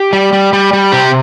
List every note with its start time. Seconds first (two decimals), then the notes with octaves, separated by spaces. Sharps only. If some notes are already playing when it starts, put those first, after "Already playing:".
Already playing: G4
0.13 G3
0.33 G3
0.53 G3
0.73 G3
0.92 C3 G4